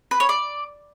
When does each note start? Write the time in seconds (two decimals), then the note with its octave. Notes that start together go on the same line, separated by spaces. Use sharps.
0.11 B4
0.20 C#5
0.29 D5